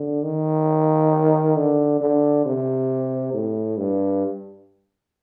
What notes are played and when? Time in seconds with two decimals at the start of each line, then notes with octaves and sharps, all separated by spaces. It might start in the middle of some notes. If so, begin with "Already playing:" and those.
Already playing: D3
0.23 D#3
1.56 D3
2.01 D3
2.46 C3
3.34 A2
3.77 G2